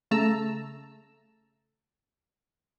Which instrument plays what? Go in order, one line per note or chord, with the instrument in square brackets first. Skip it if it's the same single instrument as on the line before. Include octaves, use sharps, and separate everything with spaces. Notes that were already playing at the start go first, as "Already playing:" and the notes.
[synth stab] C#3 A3 A5 A#5 E6